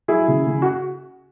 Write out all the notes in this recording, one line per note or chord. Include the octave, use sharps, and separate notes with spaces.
F#3 E4 G#4
C#3
C#3
F#4